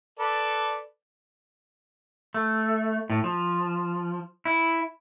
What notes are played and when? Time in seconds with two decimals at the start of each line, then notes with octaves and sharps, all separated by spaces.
0.19 A4 B4 D5
2.34 A3
3.10 A2
3.24 F3
4.45 E4